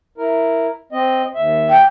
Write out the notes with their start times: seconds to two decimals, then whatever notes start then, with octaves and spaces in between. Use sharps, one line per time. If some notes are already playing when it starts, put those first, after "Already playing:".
0.18 E4 A#4
0.92 C4 D#5
1.35 D#2 E5
1.69 G5